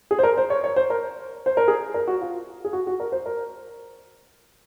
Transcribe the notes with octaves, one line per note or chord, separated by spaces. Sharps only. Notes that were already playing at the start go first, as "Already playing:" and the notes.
G#4
C5
A#4
C5
C#5
C#5
C5
A#4
C5
A#4
G#4
A#4
F#4
F4
G#4
F#4
F#4
A#4
C5
A#4